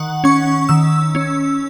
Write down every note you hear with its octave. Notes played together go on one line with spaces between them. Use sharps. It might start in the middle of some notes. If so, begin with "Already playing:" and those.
Already playing: D#3 F#5
C#4 C#6
D#3 E6
C#4